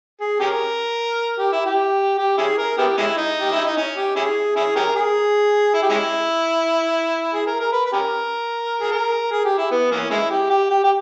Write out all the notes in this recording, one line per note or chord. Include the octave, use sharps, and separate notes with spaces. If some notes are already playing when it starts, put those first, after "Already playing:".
G#4
C#4 G4 A#4
G4
E4
G4
G4
C#4 E4 G#4
A#4
B3 E4 G4
G#3 C#4 E4
D#4
G4
E4
D#4
C#4
G4
C#4 E4 G#4
C#4 E4 G#4
C#4 G4 A#4
G#4
E4
G4
G#3 C#4 E4
G#4
A#4
A#4
B4
B4
C#4 G4 A#4
G#4
A#4
G#4
G4
E4
B3
E3 A#3 C#4
G#3 C#4 E4
G4
G4
G4
G4